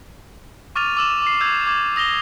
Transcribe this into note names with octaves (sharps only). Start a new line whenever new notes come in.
C#6 D6 F6 A6 D#7 F7
D6 E6 E7
D6 C7
E6 G6 G#6 F7
D6 G#6
D#6 A#6 F7 G7